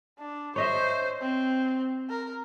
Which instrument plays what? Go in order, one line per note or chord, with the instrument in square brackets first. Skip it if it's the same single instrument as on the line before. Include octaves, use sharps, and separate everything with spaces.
[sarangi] D4
[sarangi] C5 [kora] C#5 D#5 E5
[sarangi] C4
A#4